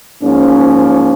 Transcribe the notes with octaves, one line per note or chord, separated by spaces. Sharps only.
G#2 F3 A#3 C#4